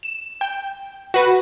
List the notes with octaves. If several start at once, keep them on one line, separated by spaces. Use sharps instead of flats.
E7
G5
F#4 B4